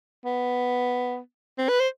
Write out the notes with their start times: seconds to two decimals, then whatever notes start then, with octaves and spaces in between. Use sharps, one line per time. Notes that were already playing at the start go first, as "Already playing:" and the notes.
0.25 B3
1.58 C4
1.69 B4
1.80 C5